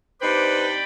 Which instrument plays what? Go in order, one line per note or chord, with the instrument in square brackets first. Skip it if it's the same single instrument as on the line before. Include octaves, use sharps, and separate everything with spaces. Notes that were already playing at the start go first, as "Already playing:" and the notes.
[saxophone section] C3 D4 D#4 [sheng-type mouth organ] B4 C5 [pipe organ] D5 G5 B5